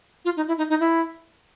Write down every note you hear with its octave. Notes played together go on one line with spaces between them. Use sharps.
F4
D#4
E4
D#4
D#4
E4